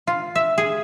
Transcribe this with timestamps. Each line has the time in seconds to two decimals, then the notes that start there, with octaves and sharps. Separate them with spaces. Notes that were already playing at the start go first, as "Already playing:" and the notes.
0.07 F4
0.35 E5
0.58 G#4